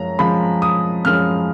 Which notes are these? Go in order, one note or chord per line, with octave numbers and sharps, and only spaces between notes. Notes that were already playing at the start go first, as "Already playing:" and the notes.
Already playing: F#2 F3 G#3 A#5
F#2 F3 G#3 B5
D#6
F#2 F3 G#3 F6